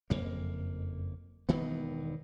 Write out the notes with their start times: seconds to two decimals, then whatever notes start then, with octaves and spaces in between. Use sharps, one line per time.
0.10 F#1 F2 A#3
1.49 E1 G2 D#3 B3